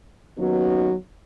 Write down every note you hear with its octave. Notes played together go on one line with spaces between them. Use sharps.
D#2 F#3 B3 C#4 D#4 F#4